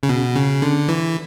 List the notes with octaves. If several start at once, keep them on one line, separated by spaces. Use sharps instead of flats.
C#3
B2
C#3
D3
E3